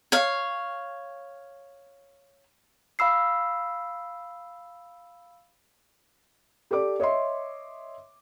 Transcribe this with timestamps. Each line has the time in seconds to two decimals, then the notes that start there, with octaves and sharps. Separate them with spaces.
0.12 C#5 F5
2.99 F5 B5 E6 C7
6.71 G4 A4 D5 D6
7.00 C#5 D#5 E5 C6